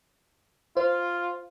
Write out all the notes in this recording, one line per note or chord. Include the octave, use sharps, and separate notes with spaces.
F4 C5